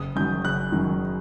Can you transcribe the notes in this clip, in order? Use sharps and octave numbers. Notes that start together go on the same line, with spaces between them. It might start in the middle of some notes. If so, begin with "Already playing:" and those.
Already playing: F#1 D#6
F#2 D#3 F#3 G6
F#1 F#6
F#2 D#3 F#3